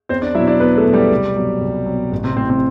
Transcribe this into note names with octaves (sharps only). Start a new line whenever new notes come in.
E2 C4 C5
D4 D5
B2 F#3 E4 E5
D4 D5
E2 B3 B4
A3 A4
B2 F#3
G3 G4
C2
B2 F#3
C2
B2 F#3
A1
C3 C4
A2 C3 E3 C4
C3 C4